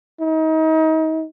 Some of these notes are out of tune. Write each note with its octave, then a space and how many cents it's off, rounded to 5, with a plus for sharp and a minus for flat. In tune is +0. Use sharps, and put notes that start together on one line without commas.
D#4 +30